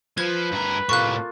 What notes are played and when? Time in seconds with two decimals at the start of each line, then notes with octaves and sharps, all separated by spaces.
0.18 F3 B4 G#6
0.52 G2 A#4
0.89 A2 C3 A#3 F4 A4 C#6 F#6